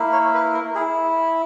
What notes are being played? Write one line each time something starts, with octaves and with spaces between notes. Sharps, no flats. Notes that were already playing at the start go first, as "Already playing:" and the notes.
Already playing: A#3 E4
C#5
B4
A#4
E4 G#4